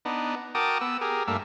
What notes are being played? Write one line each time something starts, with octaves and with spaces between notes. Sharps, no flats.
B3 D4 D#4
F#4 A#4 G5 A5 D6 D#6
B3 E6
G4 G#4 A#4
G2 A3 A#3 E5